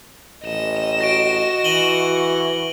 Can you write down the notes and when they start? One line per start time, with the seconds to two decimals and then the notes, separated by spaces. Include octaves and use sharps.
0.44 A1 D#5 E7
1.01 F#4 A#6 D7
1.64 E3 D#7 F#7 G7